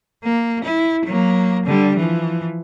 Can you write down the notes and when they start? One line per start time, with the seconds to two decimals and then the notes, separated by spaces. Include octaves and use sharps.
0.24 A#3
0.64 E4
1.05 F#3 A#3
1.65 D3 G3
1.96 E3 F3